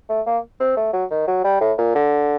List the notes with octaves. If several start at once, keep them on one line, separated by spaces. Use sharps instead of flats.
A3
A#3
C4
A3
F#3
D#3
F#3
G3
A2
A#2
D3